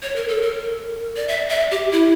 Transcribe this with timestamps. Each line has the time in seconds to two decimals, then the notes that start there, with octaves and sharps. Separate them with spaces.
0.02 C#5
0.16 A#4
0.28 A4
0.42 A#4
1.16 D5
1.28 E5
1.49 E5
1.71 G4
1.92 E4